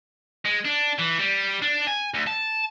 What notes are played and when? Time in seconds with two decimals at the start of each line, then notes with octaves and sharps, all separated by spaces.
0.45 G#3
0.65 D4
0.99 E3
1.19 G3
1.62 D4
1.87 G#5
2.14 D2
2.27 A5